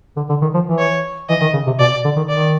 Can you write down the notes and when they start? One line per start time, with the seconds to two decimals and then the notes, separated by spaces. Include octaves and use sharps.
0.16 D3
0.29 D3
0.41 D#3
0.54 F3
0.67 E3
0.79 C#5
1.29 E3 D#5
1.41 D#3
1.53 C#3
1.67 C3
1.79 B2 D5
2.05 D3
2.16 D#3
2.29 D#3 D5